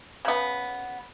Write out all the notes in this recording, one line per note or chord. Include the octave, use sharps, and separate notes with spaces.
C#3 B3